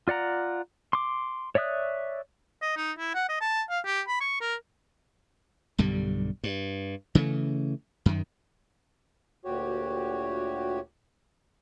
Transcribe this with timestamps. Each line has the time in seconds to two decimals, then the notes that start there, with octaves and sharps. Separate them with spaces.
0.08 F4 D5 F#5 A#5
0.93 C6 D6
1.55 C#5 D5 E5 D#6 F#6
2.62 D#5
2.77 D#4
2.98 E4
3.15 F#5
3.29 D#5
3.41 A5
3.70 F5
3.85 G4
4.08 B5
4.21 C#6
4.41 A#4
5.78 B1 G2 D3 G3
6.44 G2
7.15 C#3 E3 G#3 A3
8.06 F#2 D#3
9.45 D2 A#2 F#4 G4 C#5